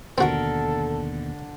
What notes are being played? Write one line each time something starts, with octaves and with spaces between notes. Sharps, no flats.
D#2 B2 D3 C4 F#4 A4 A#4